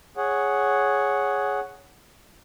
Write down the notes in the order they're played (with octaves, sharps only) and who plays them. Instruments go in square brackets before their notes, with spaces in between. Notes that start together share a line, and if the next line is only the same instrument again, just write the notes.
[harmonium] G#4 C#5 F#5